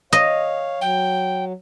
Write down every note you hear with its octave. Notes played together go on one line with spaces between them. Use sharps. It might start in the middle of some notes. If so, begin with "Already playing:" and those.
C#5 D#5 F5
F#3 G5